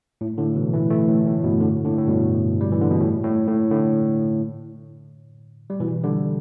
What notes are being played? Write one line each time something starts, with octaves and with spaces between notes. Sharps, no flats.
A2
A2 D3
B2 E3
E3 A3
E3 A3
A2
A2
G2 B2
A2 D3
A2 D3
A2
G2 B2
G3
E3
D3
B2
A2
A2
A2
A2 D3
G3
B2 E3
D3 G3